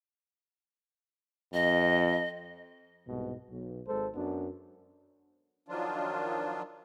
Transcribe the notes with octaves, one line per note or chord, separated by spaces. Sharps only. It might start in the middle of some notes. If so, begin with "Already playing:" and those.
F2 D#5
C2 G#2 B2
B1
G#1 G#3 A4 C5
F#2 F#3 B3 D4
D#3 F3 F#3 D4 F4